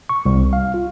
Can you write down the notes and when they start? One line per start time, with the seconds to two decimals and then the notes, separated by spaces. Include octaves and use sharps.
0.09 C#6
0.26 C2
0.53 F5
0.74 F4